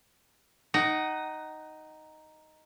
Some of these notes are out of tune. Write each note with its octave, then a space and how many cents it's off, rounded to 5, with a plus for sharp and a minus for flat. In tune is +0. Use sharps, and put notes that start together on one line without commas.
D#4 +0 F#5 +30